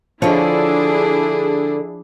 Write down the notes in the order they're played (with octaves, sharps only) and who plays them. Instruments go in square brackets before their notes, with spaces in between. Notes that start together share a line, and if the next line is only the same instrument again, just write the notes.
[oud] D3 C#5 [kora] F3 [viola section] D4 E4 G#4